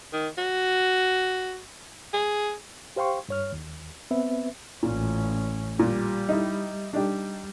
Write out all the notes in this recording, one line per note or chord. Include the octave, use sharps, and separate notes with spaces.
D#3
F#4
G#4
G4 C5 F5 G5 C6 C#6
G2 C#5 F6
D#2
B3 C4 B4 E5
A1 A#2 C#4
A#2 G3
D#4 E4
G3 D4 D#4 G4